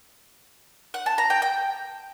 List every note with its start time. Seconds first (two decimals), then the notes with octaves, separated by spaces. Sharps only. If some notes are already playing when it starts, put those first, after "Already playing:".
0.94 F#5
1.06 A5
1.18 A#5
1.30 G5
1.42 G5